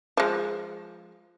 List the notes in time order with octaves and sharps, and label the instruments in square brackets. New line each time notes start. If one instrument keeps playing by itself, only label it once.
[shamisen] F3 G#3